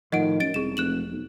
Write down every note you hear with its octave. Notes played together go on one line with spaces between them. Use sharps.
A2 D#3 F3 D#5 F#5 D7
F#2 A6 D7
E1 C2 G#4 E7
F1 F#6 E7 F#7
B1